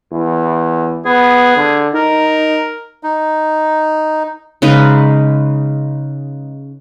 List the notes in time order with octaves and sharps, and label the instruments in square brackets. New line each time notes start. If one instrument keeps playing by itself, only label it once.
[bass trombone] E2
[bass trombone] B3 [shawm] G#4
[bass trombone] D3
[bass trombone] D#4 [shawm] A#4
[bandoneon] D#4
[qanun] C#3 G#3 D#4 B4